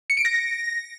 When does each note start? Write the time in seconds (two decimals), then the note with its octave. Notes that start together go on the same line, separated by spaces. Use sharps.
0.10 C#7
0.17 D7
0.25 A#6